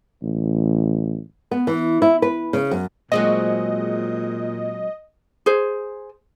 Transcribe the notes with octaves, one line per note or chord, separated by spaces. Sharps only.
A1
B3
E3
E4
B4
C#3
F#2
A#2 F#3 G#3 C4 D#5
G#4 C5